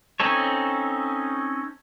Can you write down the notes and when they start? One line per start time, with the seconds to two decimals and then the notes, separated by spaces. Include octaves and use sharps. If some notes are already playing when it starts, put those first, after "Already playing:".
0.20 C4 C#4 D#4 A4 C#5